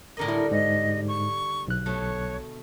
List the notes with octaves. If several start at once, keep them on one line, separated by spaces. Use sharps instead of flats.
A2 D3 A#4 D#5
G3 E4
G#2 D#5
C#6
B1 F#6
B2 A3 C#5